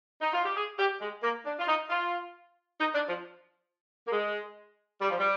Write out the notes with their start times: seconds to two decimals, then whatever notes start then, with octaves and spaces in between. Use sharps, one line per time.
0.21 D#4
0.33 F4
0.44 G4
0.56 G#4
0.79 G4
1.01 G#3
1.23 A#3
1.45 D4
1.59 F4
1.68 D#4
1.90 F4
2.79 D#4
2.94 D4
3.09 F3
4.08 A#3
4.12 G#3
5.01 G3
5.10 F3
5.19 G3